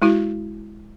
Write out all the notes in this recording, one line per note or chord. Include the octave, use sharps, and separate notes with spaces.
G#3 E4 F#4